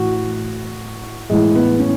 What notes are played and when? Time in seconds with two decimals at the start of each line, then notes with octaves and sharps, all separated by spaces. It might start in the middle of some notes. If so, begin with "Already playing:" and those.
Already playing: A2 E3 F#4
1.30 A2 E3 G#3
1.55 B3
1.80 C#4